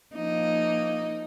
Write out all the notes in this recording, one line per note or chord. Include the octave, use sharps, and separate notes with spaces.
F3 A#3 D#4